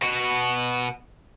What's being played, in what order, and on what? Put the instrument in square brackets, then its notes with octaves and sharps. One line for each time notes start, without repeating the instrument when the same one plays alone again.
[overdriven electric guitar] B2 F#4